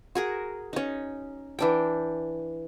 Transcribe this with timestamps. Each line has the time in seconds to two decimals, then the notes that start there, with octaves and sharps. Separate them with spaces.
0.15 F#4 G#4 A#4
0.73 C#4 D#4
1.59 E3 D4 G5